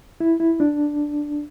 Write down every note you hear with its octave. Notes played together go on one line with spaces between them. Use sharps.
E4
E4
D4